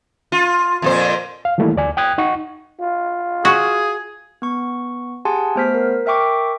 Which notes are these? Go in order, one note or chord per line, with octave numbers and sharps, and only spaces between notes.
F4
F2 A#2 C5
F5
D#3 E3 G3 A3 A#3 E4
D2 D5 G#5
G5 D#6 F#6 G#6
D#4 F#5 C#6
F4
F#4 G#4
B3 C#6
G4 G#4 F#5 G#5 A5 C6
A3 B3 C5 F6 B6
A#4
A#4 E5 G5 C#6 D6